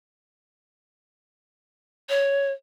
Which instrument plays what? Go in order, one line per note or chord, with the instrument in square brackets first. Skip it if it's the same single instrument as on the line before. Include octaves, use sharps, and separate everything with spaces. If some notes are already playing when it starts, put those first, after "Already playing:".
[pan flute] C#5